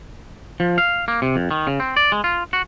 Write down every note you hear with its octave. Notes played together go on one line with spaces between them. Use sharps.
F3
F5
A#3
C3
F2
D#3
C#3
C4
D5
G#3
F4
F#4